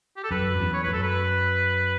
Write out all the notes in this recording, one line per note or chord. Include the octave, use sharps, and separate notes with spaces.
G4
A4
F#2 B4
E2
C#5
B4
F#2 A4
B4